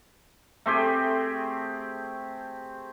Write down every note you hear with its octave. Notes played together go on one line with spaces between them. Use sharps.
A3 C4 G4 G#4